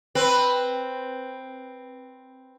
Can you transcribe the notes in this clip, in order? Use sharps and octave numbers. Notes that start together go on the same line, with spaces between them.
C4 B4